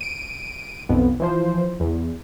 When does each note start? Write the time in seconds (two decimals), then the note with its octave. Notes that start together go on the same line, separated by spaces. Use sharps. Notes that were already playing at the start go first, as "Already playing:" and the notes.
0.01 D7 D#7
0.89 B1 F2 B3
1.20 E3 F3 C5
1.80 E2